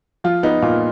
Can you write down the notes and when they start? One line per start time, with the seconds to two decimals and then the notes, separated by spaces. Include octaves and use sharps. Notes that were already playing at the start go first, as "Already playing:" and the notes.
0.24 F3 F4
0.43 B3 D#4
0.62 A#2 F4